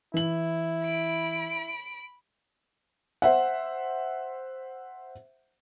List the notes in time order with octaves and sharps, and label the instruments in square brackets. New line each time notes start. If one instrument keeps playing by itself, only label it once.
[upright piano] E3 F#7 [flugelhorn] E4
[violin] B5 D7
[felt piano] C5 E5 F#5